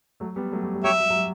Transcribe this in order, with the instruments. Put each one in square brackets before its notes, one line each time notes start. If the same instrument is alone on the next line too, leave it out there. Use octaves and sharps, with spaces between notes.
[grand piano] F#3 A3
G3 B3
F#3 A3
G3
G3
[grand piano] F#3 [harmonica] G4 C#5 E5
[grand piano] F#3
F#3
G3